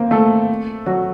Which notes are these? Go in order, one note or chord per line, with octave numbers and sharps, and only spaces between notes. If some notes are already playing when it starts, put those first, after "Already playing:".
Already playing: A#3 C4
A3 A4
F#3 F#4